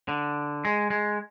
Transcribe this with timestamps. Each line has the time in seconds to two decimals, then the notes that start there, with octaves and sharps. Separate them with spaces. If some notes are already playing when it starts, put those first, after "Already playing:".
0.08 D3
0.65 G#3
0.90 G#3